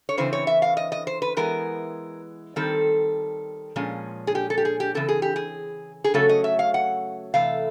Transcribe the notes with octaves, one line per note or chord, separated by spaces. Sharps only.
C#5
C#3 E3 C4 C5
C#5
E5
F5
D#5
D#5
C5
B4
E3 G#3 B3 A#4
D#3 G3 C4 A4
A#2 F3 G#3 C#4
G#4
G4
A4
G4
G#4
G4
C#3 E3 C4 A4
G#4
G4
G#4
G#4
C#3 F#3 A3 C#4 A4
D#5
E5
F5
F#5
C3 E3 A3 F5